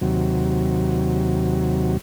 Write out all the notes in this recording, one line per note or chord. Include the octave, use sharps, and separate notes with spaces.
D#2 C3 F#3